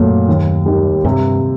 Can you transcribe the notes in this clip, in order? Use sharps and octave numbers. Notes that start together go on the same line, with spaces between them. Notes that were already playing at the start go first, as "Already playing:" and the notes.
Already playing: F#2 A#2 F#3 A3
D#2
D#3 G3
G2 C3